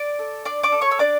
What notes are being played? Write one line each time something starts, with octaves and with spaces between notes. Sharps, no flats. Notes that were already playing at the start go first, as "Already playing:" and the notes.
Already playing: D5 D6
A4
D4 D5 D6
D5 D6
A4
C#5 C#6
E6
D4 D5 D6